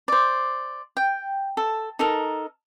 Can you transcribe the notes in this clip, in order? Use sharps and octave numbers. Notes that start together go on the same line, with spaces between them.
C5 D5
G5
A4
D#4 A4 A#4